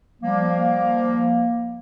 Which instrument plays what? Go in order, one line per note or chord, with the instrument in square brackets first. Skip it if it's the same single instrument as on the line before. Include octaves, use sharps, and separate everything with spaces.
[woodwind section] F3 G3 A#3